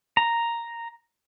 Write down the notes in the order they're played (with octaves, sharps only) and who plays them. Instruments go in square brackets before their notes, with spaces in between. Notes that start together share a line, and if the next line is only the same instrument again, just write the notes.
[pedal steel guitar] A#5